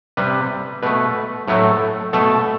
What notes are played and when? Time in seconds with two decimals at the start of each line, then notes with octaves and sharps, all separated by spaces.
0.17 C3 G3 B4
0.83 B2 A3 B4
1.48 A2 F#3 A3
2.13 B2 A3 A4